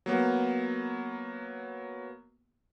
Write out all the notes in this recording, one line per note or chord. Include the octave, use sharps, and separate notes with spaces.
F#3 A#3 B3